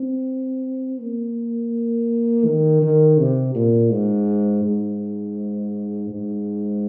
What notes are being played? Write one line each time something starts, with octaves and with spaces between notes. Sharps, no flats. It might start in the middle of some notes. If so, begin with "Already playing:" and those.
Already playing: C4
A#3
D#3
D#3
C3
A#2
G#2
G#2
G#2